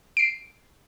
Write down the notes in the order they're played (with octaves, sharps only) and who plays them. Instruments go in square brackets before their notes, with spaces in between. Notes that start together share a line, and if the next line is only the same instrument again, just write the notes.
[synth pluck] C7 D7